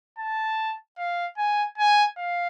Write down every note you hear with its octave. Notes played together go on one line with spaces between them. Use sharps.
A5
F5
G#5
G#5
F5